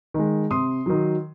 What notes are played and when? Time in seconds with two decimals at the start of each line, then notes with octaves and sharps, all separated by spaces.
0.14 D#3 G#3
0.50 C3 C6 D#6
0.86 D#3 F#3